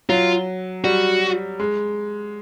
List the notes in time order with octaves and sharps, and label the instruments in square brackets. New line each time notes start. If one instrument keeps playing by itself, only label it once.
[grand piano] F#3 [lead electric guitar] F4
[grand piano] G3 [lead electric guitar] F#4
[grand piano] G#3